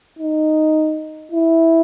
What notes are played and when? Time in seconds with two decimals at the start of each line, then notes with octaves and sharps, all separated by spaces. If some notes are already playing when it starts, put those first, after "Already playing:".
0.19 D#4
1.32 E4